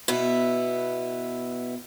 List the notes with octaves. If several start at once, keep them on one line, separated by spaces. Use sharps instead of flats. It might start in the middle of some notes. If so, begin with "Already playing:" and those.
B2 B3 E4